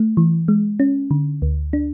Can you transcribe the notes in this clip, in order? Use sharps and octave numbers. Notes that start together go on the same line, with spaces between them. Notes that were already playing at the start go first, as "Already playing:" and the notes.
Already playing: A3
E3
G#3
C#4
D3
D2
D4